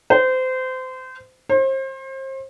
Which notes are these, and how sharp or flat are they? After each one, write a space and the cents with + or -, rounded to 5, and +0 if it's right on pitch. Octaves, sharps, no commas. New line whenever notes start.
C5 -25
C5 +35